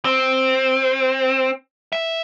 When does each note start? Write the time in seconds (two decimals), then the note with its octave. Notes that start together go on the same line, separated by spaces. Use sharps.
0.05 C4
1.93 E5